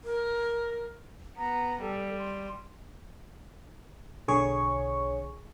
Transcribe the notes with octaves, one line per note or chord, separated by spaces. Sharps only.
A#4
B3 A#5
G3 A4
C6
B1 D3 G#4 C#5 C#6